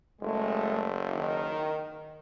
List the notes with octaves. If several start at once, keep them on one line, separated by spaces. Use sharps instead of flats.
F#1 G#3 A3
D#3